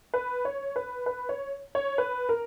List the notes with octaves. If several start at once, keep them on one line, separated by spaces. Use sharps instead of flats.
B4
C#5
B4
B4
C#5
C#5
B4
A#4